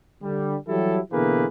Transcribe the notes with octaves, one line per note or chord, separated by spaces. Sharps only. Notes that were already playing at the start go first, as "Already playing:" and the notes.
D3 G3
E3 F#3 G3 E4 G4 A4
B2 D3 E3 A#3 G#4 B4